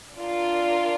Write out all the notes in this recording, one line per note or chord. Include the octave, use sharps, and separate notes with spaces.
D4 F4 A#4 D5